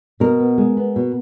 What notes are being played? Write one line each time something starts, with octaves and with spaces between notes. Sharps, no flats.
B2 A#4
B3
G#3
B3
B2